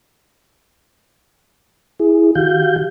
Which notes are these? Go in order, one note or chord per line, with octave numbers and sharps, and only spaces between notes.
E4 G#4
D#3 F#4 G4 F5 G6